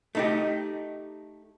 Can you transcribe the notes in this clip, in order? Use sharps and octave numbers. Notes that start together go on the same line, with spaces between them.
A3 D#4 G4